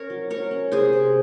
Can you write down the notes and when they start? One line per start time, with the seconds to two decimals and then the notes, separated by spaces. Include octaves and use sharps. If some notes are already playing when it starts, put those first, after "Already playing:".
Already playing: C#4 A#4 C#5
0.10 F#3
0.30 F#3 A#4 C#5
0.51 C#4
0.72 C3 G#4 C5
0.93 C3